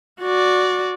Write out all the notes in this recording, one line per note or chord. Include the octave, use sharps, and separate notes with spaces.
F#4 D5